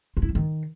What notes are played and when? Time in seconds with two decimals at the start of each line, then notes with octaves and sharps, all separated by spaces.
0.17 F4
0.23 E4
0.29 F3
0.35 D#3